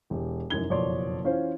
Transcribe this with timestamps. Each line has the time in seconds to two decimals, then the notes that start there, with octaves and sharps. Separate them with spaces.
0.10 E1 G4
0.50 F1 F#2 E3 D#4 G#6 G7
0.70 F#1 F2 B2 C#5 D5 C6
1.24 E3 C#4 F4 C5